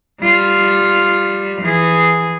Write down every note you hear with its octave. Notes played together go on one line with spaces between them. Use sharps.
G3 F4
E3 G#4